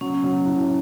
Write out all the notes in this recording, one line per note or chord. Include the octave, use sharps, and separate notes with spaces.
F#3 C#4
F#3
A2